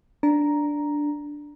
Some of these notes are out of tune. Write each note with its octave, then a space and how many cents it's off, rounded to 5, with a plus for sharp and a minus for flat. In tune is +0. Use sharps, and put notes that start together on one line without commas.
D4 +0 A#5 +5